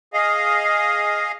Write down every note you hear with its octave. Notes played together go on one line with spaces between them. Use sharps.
G#4 D#5 F5